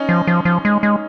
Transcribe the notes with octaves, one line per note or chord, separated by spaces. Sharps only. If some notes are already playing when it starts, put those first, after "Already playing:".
Already playing: C#4 D#4
F3
F3
F3
G#3
G#3